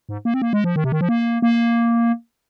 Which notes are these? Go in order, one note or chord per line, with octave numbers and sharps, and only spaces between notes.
G#2
A#3
C4
A#3
G#3
F3
D#3
C3
D#3
F3
A#3
A#3